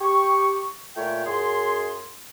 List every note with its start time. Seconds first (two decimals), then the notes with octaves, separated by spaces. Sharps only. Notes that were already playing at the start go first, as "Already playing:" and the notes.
0.01 G4 C#6
0.97 A#2 A3 F4 C#5 G5
1.26 F#2 G#4 C6